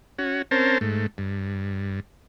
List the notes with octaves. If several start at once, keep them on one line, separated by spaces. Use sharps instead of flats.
C#4 F#4
C4 C#4 A#4 C5 A5
G#2 A3
G2